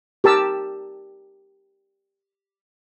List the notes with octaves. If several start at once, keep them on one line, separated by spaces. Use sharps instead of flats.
G4 A#4 A5 E6